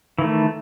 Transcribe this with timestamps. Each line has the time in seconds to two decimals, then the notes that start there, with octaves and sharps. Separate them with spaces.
0.19 E3
0.21 D#3
0.24 A3